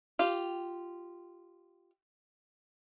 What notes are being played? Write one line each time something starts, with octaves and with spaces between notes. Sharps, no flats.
F4 G4